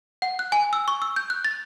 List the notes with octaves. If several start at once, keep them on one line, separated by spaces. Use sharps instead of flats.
F#5
F#6
G#5
E6
C#6
E6
G6
F#6
A6